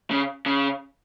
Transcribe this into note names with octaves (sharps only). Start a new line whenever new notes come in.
C#3
C#3